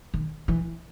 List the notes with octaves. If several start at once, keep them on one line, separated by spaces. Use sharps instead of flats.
D#3
E3